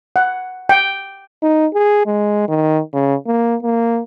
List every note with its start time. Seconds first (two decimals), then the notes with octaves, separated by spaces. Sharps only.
0.16 F#5
0.69 G5
1.42 D#4
1.74 G#4
2.06 G#3
2.48 D#3
2.93 C#3
3.26 A#3
3.62 A#3